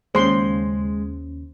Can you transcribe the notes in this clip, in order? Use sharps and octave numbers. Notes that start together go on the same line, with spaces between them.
D#2 C#3 G#3 C5 C6